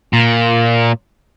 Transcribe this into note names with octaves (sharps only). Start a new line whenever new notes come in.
A#2